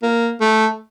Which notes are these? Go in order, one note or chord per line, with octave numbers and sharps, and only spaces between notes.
A#3
A3